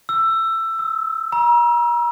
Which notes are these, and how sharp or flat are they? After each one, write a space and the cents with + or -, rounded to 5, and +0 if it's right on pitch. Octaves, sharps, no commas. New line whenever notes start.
E6 +15
E6 -30
A#5 +35